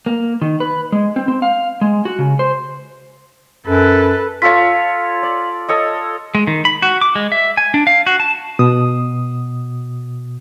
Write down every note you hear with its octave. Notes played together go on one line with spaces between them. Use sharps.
A#3
D#3
B4
G#3
C4
C4
F5
G#3
F#4
C#3
C5
F#2 A4 B4
F4 A4 C#5 F5 B6
D5
A4 C#5 D#5
G#3
D#3
B5
F#4
D6
G#3
E5
G#5
D4
F5
F#4
A5
B2 D#6